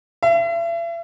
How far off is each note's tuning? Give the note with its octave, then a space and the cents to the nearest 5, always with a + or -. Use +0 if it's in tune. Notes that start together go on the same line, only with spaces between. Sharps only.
E5 +40